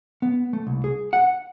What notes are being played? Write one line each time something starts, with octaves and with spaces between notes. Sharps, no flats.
B3
A3
C2
G#4
F#5